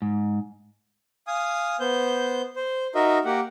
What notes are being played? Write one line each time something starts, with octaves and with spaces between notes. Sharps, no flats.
G#2
F5 G#5 D#6
B3 C5 G6
C5
D#4 F#4 A#4 D#5 E5
A#3 G4 F#5